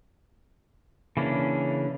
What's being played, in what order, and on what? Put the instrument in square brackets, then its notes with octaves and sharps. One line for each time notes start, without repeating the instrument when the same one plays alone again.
[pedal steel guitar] C#3 E3 A#3 C#4 D4